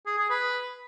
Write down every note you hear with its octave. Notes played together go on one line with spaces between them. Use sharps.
G#4
G#4
B4